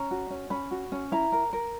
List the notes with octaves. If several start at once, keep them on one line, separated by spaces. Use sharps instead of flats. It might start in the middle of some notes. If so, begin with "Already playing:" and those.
Already playing: C#4 A#5
F#4
C#4
C#4 B5
F#4
C#4
E4 A#5
A#4
A#4